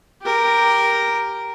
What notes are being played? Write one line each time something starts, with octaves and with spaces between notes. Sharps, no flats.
G4 A#4